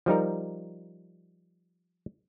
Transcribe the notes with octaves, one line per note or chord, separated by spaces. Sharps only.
F3 G3 D#4 A#4